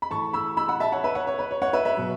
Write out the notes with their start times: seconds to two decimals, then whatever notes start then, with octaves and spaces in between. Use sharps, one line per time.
0.02 B5
0.11 A2 E3 A5 C#6
0.33 B5 E6
0.57 B5 E6
0.68 F#5 B5
0.80 E5 A5
0.92 C#5 F#5
1.04 B4 E5
1.15 C#5 F#5
1.27 C#5
1.39 B4
1.51 C#5
1.62 C#5 F#5
1.73 B4 E5
1.85 B4 E5
1.97 B2 F#3